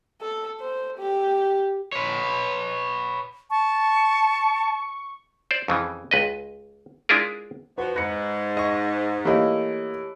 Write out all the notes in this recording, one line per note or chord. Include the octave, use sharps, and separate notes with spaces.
A4
C5
G4
B4 C#5
A5 C#6
C5 D5
F2 C#3 E3
C#2 B4 D#5
G#3 D4 E4 F4 G#4 A#4
F3 F#4 B4
G#2 B4 A#6 C#7
D#5 C#6 A#6
E3 A3 A#3 E4 G4 C#5 D#5 F5